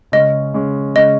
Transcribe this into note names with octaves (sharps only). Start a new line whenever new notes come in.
C#3 G#3 C#4 D#5
C#3 G#3 C#4
C#3 G#3 C#4 D#5